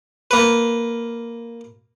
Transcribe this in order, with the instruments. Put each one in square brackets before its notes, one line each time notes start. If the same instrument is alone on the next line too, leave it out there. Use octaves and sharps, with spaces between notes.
[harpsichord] A#3 B4